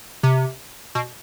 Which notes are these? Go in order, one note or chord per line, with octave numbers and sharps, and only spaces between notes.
C3
B2